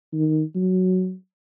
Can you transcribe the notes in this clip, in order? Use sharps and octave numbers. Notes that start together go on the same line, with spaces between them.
D#3
F#3